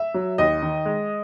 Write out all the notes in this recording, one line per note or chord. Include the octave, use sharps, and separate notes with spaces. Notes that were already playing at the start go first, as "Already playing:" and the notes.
Already playing: E5
F#3
D#2 D#5
D#3
G#3